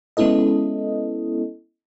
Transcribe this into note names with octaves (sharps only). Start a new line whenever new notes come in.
G#3 B3 C#4 E4 A4 D#5